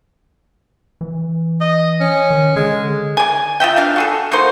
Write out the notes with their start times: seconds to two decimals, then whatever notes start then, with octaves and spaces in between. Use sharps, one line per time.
1.01 E3
1.61 D#5
2.01 C#4
2.30 D#3
2.56 D3 G#3
3.17 D5 G#5
3.60 F4 D#5 E5 G5
3.76 E3 D4 F5
3.96 F#4 G#4 A4
4.32 A#3 D#4 F#4 C5